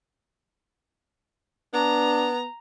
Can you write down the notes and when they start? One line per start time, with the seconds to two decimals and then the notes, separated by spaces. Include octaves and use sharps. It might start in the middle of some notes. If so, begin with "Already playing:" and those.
1.74 B3 D4 A#5